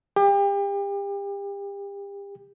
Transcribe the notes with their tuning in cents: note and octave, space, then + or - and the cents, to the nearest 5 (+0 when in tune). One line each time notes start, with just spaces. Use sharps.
G4 +35